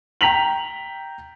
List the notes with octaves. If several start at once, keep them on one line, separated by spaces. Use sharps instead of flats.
G5 A#5 B6 F7 F#7